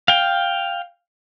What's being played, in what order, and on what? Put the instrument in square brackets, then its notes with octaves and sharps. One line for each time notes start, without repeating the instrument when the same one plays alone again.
[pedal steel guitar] F5 G5